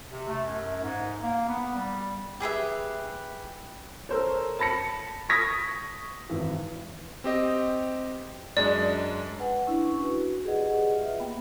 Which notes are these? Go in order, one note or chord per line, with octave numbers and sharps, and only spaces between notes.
C3
A3
F#2
G#2
A#3
B3
G3
G4 G#4 B4 E5
A4 A#4 C5 C#5
A5 B5 A#6 C#7
C#6 D#6 G#6 A#6 B6
G#1 E3
C4 G4 D#5
F#2 G#3 D4 D5
B4 F#5 G#5
C#4 D4 E4 C#6
F#4 B4
G4 G#4 B4 D5 D#5 F#5
F4 E5
A#3 B3 G5 B5